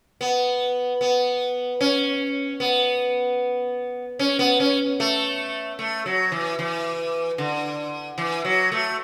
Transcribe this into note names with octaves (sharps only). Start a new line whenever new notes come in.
B3
B3
C#4
B3
C#4
B3
C#4
A3
A3
F#3
E3
E3
D3
E3
F#3
A3